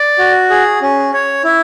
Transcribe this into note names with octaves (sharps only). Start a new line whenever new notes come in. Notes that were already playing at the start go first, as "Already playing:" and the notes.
Already playing: D5
F#4
G#4
C#4
C#5
E4